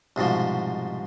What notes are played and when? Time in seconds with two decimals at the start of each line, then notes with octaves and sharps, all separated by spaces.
0.16 C2 G#2 B2 F3